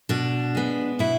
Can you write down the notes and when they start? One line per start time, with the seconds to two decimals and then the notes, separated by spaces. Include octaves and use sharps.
0.09 B2 D4
0.55 G#3 B3
0.99 B2 E4